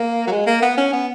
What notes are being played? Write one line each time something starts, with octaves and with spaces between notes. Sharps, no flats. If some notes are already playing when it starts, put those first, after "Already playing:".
Already playing: A#3
F#3
G#3
A#3
B3
C#4
B3